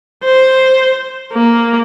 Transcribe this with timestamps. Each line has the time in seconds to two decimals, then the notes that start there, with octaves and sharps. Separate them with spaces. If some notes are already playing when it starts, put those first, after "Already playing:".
0.24 C5
1.33 A#3